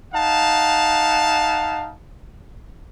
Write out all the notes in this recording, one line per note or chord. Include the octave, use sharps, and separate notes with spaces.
D#4 F5 F#5 A5